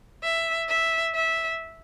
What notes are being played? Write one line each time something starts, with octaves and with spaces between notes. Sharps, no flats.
E5
E5
E5